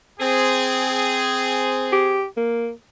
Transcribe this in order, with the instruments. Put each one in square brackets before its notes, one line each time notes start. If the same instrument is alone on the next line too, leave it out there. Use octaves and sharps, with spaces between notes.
[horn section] C4 G#4
[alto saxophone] G4
A#3